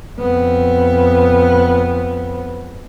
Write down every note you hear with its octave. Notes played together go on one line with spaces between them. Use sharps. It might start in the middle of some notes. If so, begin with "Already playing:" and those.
F2 B3